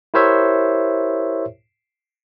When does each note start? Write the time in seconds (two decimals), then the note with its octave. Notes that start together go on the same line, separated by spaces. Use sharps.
0.14 E4 G4 A#4 C5 C#5 E5